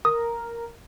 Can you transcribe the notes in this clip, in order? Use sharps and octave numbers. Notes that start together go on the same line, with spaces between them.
A#4 D#6